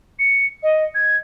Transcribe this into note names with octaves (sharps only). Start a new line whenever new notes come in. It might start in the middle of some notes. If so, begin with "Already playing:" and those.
C#7
D#5
G#6